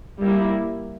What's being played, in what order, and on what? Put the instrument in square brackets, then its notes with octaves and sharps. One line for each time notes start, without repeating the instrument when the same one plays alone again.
[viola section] G3 A#3 E4